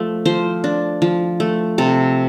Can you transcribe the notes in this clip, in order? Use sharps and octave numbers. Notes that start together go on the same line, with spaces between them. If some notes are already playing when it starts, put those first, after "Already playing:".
Already playing: F3 A3
F3 C5
D4
F3
A3
C3 A4